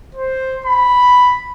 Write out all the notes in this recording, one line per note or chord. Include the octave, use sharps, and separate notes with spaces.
C5
B5